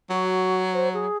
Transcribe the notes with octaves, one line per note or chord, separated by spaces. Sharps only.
F#3 F#4
C5
G#4